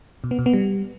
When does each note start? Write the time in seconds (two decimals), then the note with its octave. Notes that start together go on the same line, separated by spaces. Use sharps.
0.24 B2
0.31 B3
0.39 B2
0.46 B3
0.53 G3